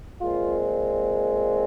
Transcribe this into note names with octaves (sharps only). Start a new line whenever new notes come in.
A#2 G#3 C4 F4